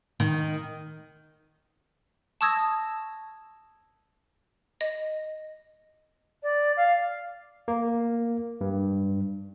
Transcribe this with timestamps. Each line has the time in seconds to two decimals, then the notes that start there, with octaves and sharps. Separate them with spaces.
0.20 D#3
2.41 A5 C#6 D#6 E6 G#6 A#6
4.81 D#5
6.43 D5
6.77 F5
7.68 A#3
8.61 G2